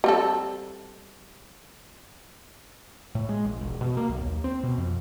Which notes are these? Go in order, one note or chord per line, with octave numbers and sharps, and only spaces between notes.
G3 C4 A4
A2
G#3
A#1
E1
B2
A#3
B1
D#2
C4
B2
F2